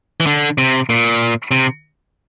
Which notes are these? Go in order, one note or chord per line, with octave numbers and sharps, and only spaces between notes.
E3
D3
C3
A#2
C3